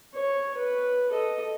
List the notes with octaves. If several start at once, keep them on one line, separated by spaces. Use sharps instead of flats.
C#5
B4
A4 D#5